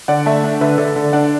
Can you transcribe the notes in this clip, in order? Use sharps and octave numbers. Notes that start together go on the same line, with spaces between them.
D3 D5 F#5
A3 E5 A5
D4
D3 B4 E5
D3 A4 D5
D3
D4 D5 F#5